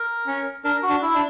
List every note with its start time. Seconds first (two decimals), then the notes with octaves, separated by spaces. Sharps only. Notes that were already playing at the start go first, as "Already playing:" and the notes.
Already playing: A#4
0.27 C#4
0.64 D4 A#4
0.83 F#4
0.90 D4
1.02 E4
1.15 D4